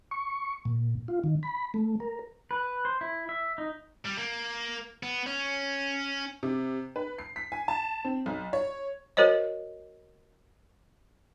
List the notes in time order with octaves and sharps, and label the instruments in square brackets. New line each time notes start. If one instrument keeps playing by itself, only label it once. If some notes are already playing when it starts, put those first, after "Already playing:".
[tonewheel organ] C#6
A#2
F4
D#3
B5
A3
A#4
[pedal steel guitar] B4
C5
E4
E5
D#4
[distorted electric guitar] G3
A#3
B3
C#4
[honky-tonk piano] C3
B4
C7
B6
G#5
A5
C4
B1
C#5
[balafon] F#4 A#4 C5 C#5 D#5